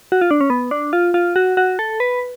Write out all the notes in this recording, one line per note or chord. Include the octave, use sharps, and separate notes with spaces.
F#4
F4
D4
C#4
B3
D4
F4
F4
F#4
F#4
A4
B4